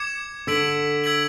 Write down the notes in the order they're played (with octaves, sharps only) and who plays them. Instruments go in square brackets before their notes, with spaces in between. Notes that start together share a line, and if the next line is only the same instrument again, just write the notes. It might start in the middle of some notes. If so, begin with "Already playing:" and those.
Already playing: [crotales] D6 G#6 C#7 E7
[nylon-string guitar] D3 [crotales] E6 G#6 B6 D7 F#7
[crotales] E6 G#6 B6 D7 F#7